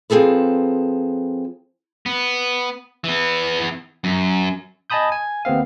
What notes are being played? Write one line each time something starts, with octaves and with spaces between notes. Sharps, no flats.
F3 C4 G#4 A4 B4
B3
E3 B3
F#2
D#5 G#5 A5 B5 D#6 G6
G#5
D#2 B3 C4 F5